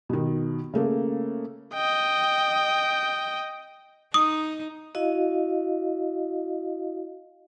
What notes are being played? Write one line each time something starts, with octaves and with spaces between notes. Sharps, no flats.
B2 D#3
C#3 A3 A#3
D#5 G5
D#4 D#6
E4 F#4 D#5 F5